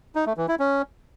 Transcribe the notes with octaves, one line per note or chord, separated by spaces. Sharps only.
D#4
A3
E3
E4
C#4